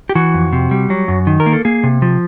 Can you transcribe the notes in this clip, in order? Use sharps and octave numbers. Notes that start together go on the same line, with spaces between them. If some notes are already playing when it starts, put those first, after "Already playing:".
G4
E3 F#4
F2
C3
G3
F#3
F#2
D#3
A#4
A#3
A4
A#3 G#4
C3
F3